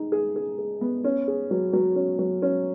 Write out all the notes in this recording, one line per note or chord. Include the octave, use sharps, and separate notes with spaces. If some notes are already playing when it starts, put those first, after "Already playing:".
Already playing: D#4 G#4
G#4
G#4
G#4
B3
C#4
G#4
F#3
F#3
C#4
F#3
C#4